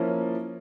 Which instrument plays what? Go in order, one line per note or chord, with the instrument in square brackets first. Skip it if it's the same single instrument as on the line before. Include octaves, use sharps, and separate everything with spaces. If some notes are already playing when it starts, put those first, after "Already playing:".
Already playing: [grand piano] F3 A#3 C#4 E4